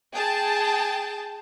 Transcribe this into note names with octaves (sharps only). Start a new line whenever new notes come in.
G#4 G5 A5